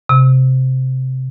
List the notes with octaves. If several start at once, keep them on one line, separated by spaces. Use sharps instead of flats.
C3